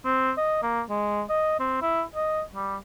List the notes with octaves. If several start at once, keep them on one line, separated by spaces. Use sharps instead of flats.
C4
D#5
A#3
G#3
D#5
C4
E4
D#5
G3